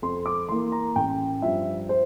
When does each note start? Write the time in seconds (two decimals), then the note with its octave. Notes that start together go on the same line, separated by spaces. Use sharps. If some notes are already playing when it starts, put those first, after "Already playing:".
0.02 F2 C6
0.26 D6
0.49 E3 A#3 C6
0.72 A#5
0.96 A1 G5
1.42 G2 F3 E5
1.89 C5